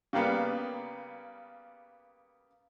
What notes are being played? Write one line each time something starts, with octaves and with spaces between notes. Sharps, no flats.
C#3 G3 A#3 B3